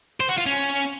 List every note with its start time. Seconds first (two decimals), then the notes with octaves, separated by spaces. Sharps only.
0.20 C5
0.29 F#4
0.38 F4
0.46 C#4